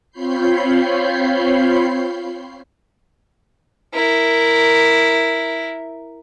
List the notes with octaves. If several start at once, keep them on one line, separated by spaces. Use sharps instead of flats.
C4 F4 C#5 B5 G6 C7
E4 A#4